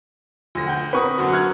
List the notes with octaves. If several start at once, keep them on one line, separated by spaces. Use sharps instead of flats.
D2 F3 A#6
F#5 G5 G6
C4 A#4 B4 B5 C#6 D#6
F#2 D3 F#4
F6 F#6 G#6